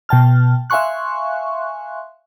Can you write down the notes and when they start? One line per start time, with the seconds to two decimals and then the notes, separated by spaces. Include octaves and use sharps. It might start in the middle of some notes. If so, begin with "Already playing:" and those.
0.09 B2 G5 A5 F6
0.70 E5 F5 G#5 C6 C#6 F#6